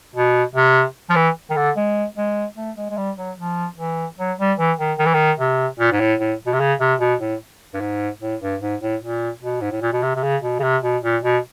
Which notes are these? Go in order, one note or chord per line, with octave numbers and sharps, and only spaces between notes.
B2
C3
F3
E3
D#3
D3
G#3
G#3
A3
G#3
G#3
G3
F#3
F3
E3
F#3
G3
E3
D#3
D#3
E3
D#3
C3
A#2
G#2
A2
A2
B2
C3
C#3
C3
B2
A2
G2
G#2
A2
G2
G#2
A2
A#2
B2
G#2
A2
A#2
B2
C3
C3
C#3
B2
C#3
C3
B2
A#2
B2